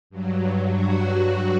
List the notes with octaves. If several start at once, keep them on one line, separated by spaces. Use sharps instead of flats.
G2 F#3
F#4